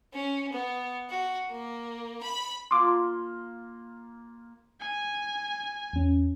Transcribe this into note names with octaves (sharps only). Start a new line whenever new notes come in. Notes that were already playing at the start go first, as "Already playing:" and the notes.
C#4
B3
F#4
A#3
B5
A#3 F4 C6 D6
G#5
E2 C#4